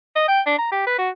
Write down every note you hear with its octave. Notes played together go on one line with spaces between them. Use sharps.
D#5
G5
D4
A#5
G4
B4
F#4